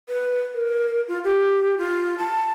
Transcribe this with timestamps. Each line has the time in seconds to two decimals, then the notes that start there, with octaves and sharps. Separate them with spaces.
0.09 B4
0.54 A#4
1.08 F4
1.24 G4
1.78 F4
2.19 A5